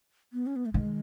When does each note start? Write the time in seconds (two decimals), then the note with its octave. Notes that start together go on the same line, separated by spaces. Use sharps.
0.33 B3
0.47 C#4
0.56 B3
0.66 A3
0.74 D#3 G#3